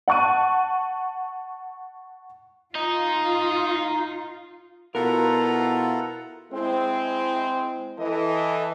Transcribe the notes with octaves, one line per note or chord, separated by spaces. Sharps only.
F#5 A5 C#6 F#6 D#7
D#4 F4
B2 E4 F4 A4 A#4 F#5 A#5
G#3 C4 E4
E3 A4 D#5